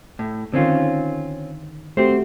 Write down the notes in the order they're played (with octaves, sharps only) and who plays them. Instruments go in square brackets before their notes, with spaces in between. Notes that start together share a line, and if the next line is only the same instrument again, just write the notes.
[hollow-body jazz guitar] A2
[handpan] D3 D#3 [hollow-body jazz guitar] C4 C#4 F4
[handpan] A3 F#4 G4 [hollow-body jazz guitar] C4 C5